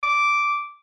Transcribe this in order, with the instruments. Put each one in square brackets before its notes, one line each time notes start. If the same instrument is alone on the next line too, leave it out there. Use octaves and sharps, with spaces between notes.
[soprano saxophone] D6